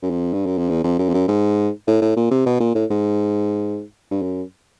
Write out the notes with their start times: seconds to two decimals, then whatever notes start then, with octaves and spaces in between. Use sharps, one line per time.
0.03 F#2
0.10 F2
0.33 G2
0.46 F#2
0.58 F2
0.70 E2
0.84 F2
0.99 F#2
1.09 F2
1.14 F#2
1.28 G#2
1.88 A2
2.02 A2
2.16 A#2
2.31 C3
2.46 B2
2.60 A#2
2.75 A2
2.90 G#2
4.11 G2
4.22 F#2